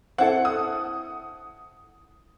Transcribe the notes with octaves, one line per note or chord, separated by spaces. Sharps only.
C4 E4 A4 F#5
D#6